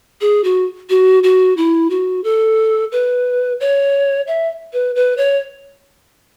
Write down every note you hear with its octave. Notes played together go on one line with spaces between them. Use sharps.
G#4
F#4
F#4
F#4
E4
F#4
A4
B4
C#5
E5
B4
B4
C#5